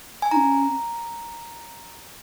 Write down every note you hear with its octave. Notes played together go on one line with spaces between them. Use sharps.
G#5
D#4 A#5
C#4